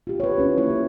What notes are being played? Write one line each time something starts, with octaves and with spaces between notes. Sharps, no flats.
F4 G4
B4 C#5
C#4 E4
A#3 E4 C#5
G4